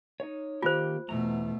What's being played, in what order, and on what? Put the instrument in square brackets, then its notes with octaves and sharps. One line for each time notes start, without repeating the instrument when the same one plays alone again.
[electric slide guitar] D#4 C#5
[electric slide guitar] D#3 A#3 G4 [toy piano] F4 C5
[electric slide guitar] E2 A#5 [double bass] B2 A3